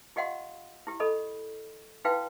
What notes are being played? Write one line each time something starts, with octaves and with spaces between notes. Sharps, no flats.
F4 G4 D#5 F5 F#5 C6
E4 G4
A4 D#5 B5
D#4 E4 F#4 B4 F5 G5